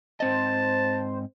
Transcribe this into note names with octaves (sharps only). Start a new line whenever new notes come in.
G#2 C4 C5 D#5 A5